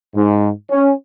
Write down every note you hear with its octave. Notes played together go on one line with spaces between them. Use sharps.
G#2
C#4